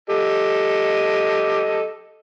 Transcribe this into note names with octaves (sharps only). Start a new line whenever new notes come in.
G4 A4 D#5